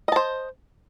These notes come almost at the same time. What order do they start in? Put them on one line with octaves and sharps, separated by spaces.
D#5 A5 C5